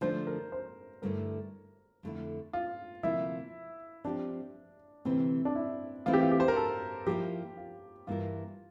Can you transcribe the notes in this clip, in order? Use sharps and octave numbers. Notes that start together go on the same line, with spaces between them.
D3 F3 A3 D4 C5
A#4
C5
G2 D3 A3 E4 A#4
F2 D3 A3 E4
F4
D2 C3 F3 A#3 E4
F3 C4 D4 G4
D2 C3 E3 C4
D4
E4
E3 A3 C4 E4 F4
G4
F4
G4
C5
A#4
A4
F3 A#3 E4 G4
F4
G2 E3 A#3 E4 F4 A#4